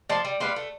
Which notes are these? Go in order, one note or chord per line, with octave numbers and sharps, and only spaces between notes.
F3 D5 A5 C6
G3
G3 B4 F5 C6
A3